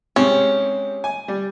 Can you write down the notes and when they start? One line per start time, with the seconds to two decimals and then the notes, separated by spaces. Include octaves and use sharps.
0.16 G#2 C3 C4 C#4
1.04 G#5
1.28 G3